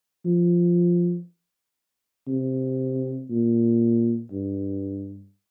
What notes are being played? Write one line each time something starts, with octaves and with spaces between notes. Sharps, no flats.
F3
C3
A#2
G2